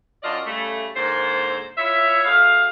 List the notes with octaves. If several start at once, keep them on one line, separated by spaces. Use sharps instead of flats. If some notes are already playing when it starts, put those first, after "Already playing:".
F#2 D4 F4 D5 D#5
C#3 G3 A3
G#2 D3 A#3 C5
E4 F4 C#5 E5
D2 G#4 F5